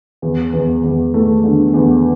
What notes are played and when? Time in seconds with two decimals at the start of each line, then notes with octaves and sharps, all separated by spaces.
0.22 E2
0.53 E2
0.84 E2
1.14 A3
1.44 D3
1.74 E2